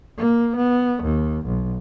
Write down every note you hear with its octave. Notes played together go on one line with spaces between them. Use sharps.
A#3
B3
D#2
B1